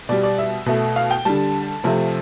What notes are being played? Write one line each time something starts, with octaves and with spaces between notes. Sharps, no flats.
B2 G3 D5
D5
E5
B2 A3
F5
G5
D3 G3 A5
C3 F3 A3